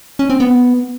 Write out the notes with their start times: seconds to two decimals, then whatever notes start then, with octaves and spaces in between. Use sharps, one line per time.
0.19 C#4
0.30 C4
0.40 B3